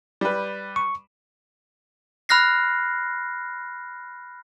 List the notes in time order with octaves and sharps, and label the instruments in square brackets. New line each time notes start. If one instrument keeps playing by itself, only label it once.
[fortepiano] G3 B4
[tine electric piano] C#6
[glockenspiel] B5 F6 F#6 A#6 C7